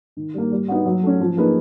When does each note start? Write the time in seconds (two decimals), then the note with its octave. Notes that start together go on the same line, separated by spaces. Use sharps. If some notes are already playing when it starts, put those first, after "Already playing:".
0.17 D#3
0.34 G3 A#3
0.52 G3
0.68 B3 D#4 F#4
0.86 F#3
1.03 A3 C#4
1.20 F3
1.37 A#3 D#4 G#4 B4